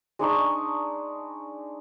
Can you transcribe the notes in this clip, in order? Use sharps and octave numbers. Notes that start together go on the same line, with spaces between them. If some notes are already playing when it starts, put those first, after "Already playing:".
G#3 D4 D#4 C#6